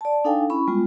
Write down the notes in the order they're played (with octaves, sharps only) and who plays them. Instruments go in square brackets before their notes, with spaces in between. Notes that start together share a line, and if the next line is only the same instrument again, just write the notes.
[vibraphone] D5 A5
D4 D#4 A4 F5 G5 G#5
C#4 E4 B5 C#6
G3 G#3 B3 F4